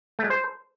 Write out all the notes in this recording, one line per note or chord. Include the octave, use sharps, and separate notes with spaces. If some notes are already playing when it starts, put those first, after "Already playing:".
A3
G#3
C5